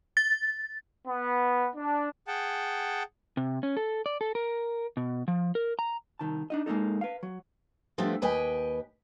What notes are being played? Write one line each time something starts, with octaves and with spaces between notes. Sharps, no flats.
A6
B3
D4
G#4 F#5 G5 A5
C3
C#4
A4
D5
A4
A#4
B2
F3
A#4
A#5
C2 D#3 A5
D4 D#4 D#5
G#3 A#3 B3 D#4 A4
B4 F5
F#3
F3 G3 A3 B3 C4 D4
D#2 B4 D#5 G5 G#5